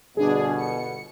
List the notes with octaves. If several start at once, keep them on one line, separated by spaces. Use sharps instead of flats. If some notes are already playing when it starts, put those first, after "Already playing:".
G1 B2 D4 G#4
C#7